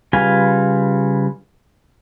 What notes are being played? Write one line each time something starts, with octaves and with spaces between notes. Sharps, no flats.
C#3 G3 F4 B4 G#5